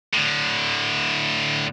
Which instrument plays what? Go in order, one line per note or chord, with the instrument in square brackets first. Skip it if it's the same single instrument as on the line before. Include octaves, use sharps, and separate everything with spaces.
[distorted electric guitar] A2 D3